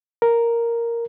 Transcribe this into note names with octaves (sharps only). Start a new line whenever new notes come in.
A#4